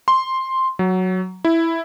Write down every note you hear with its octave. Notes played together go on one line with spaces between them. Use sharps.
C6
F#3
E4